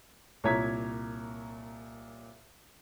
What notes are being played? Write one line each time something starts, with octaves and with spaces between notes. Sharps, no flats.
C2 A#2 C#5 A#5 G#6 B6